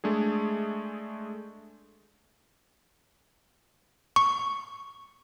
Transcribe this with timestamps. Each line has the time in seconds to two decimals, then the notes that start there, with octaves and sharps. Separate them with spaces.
0.04 G#3 A3 D4 G#4
4.16 C#6